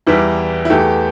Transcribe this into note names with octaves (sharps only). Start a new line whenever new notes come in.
E2 E3 G3 E4
E4
E2 E3 A3 G4